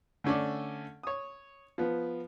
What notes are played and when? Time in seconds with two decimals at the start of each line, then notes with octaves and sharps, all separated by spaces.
0.24 D3 A3 C#4 A4 D5
1.03 C#5 D#6
1.78 F3 B3